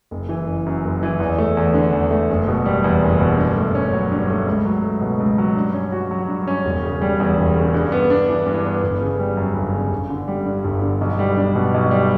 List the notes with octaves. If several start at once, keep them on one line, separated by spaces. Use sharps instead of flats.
F#1
E3
F#1
F#2
F#1
E3
E2
A3
E2
D3
E2
A3
F#1
B2
G3
E2
F#1
B2
G2
A3
C#4
F#3
G2
A3
C#2
F#3
A3
B2
C#2
F#3
G2
C#4
F#4
F#3
G2
C#4
E1
C#3
G3
E2
E1
C#3
G2
B3
D4
E3
G2
B3
G1
C#3
G3
F#2
G1
C#3
G1
D3
G3
G2
G1
D3
B1
G3
D4
B2
B1
G3